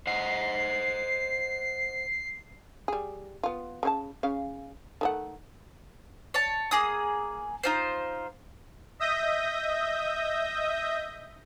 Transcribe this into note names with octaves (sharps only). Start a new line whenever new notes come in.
C5 D#5 F#5 C7
G3 G#4
B3 F4
C#3 C#4 A5
C#3 C#4 F5
D#3 A3 F#5
C#5 A5
A#3 G#4 D#6
D#4 F4 C5
D#5 E5 D#6 G6 A#6